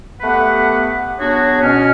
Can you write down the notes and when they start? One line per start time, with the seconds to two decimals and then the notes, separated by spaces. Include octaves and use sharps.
0.21 A3 B3 G4 B4 F#5
1.18 F#3 B3 D4 F#4 G#4 C#5
1.62 B2 C#4 F6